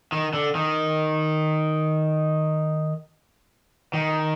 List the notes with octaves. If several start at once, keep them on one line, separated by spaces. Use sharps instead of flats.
D#3
D3
D#3
D#3